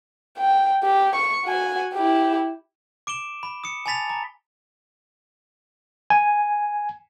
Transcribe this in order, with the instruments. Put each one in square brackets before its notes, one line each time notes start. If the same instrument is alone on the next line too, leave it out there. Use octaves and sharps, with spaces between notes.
[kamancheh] G5
G4
C#6
F#4 G#5
E4 G4
[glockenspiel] D6 D7 E7 G7
B5
D#6 C#7
G#5 A5 B5 A6 B6 F7
A#5
[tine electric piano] G#5